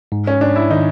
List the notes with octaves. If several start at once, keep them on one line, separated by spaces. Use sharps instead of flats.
G#2
C#4
G#2 D4
E4
D#3 D#4